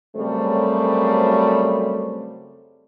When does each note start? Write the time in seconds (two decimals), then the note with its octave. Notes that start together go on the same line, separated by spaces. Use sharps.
0.16 F#2 C#3 G3 A3 C4 C5